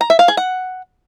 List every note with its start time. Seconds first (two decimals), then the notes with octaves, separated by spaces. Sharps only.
0.01 A#5
0.10 E5
0.19 F5
0.28 G#4
0.37 F#5